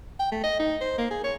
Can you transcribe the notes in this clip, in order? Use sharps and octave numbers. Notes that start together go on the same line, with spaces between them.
G5
A3
D#5
D#4
C5
A#3
G#4
C#5